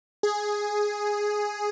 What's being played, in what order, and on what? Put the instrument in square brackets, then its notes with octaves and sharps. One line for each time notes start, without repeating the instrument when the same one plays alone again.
[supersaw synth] G#4